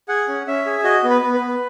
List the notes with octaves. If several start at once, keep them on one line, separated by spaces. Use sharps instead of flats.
G#4 F#5
C#4
C#4 E5
G#4
F#4 D#5
B3
B4
B3
B4
B3